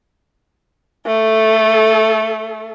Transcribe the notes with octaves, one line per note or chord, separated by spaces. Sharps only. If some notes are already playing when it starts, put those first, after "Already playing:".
A3 A4